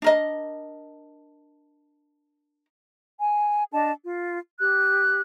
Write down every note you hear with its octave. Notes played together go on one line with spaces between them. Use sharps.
D4 A#4 D#5
G#5
D4 D#5 A5
F4
G4 F#6